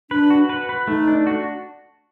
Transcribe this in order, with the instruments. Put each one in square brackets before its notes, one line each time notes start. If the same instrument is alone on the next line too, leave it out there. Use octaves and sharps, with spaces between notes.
[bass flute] D4 [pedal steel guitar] B4
[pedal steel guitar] F#4
B4
B4
[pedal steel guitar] A3 [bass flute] D#4
[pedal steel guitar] D4
F#4